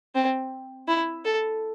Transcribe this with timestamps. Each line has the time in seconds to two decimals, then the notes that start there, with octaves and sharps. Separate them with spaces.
0.15 C4
0.88 E4
1.25 A4